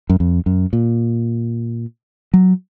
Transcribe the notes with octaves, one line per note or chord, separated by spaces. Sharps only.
F#2
F2
F#2
A#2
F#3